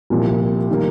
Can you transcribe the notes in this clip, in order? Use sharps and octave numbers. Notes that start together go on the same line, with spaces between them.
C2 A#2 F3
D#3 G3 A#3